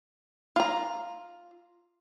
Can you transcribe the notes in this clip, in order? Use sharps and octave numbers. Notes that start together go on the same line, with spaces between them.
F4 A#5